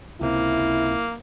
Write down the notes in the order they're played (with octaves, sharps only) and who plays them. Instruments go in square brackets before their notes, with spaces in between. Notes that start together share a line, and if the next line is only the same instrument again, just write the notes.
[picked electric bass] C#2 C3 [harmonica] A#3 [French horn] E4